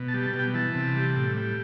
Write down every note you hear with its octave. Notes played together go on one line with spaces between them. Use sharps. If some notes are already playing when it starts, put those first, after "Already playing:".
Already playing: B2
A5
G3
A5
B2
G5
E3 A5
C3
G3
A2
G3